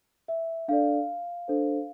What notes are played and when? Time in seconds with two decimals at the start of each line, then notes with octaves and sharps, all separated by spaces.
0.28 E5
0.68 D4 A4 D5 F5
1.48 D4 A4 C5